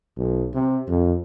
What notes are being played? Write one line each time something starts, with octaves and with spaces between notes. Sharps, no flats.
B1
C3
F2